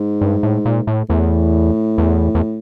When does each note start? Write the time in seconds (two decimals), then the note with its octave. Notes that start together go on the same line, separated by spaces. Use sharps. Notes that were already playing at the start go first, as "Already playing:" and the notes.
Already playing: G#2
0.21 G2
0.43 A2
0.65 A#2
0.87 A2
1.09 E2 A2
1.98 E2
2.35 E2